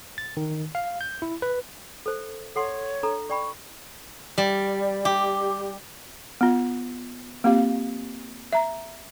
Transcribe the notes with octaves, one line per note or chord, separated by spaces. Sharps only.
A6
D#3
F5
G6
E4
B4
A4 C5
A4 C#5 F#5 C6
D4 A4 A#5
D5 G5 B5 C#6
G3
G4
B3 F4
A#3 C4 F4 G4 F5
E5 A#5